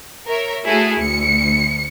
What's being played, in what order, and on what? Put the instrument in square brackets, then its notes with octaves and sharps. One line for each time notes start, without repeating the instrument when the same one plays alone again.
[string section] A#4 C#5 E5
A3 E4 F#4 G#4 A4
D2 C#7